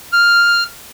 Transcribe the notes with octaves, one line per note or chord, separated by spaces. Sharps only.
F6